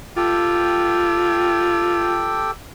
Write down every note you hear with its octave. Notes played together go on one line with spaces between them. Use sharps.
F4 G4 A4 G5